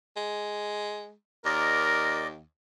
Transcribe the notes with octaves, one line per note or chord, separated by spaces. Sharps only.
G#3
D#2 A#4 D5 D#5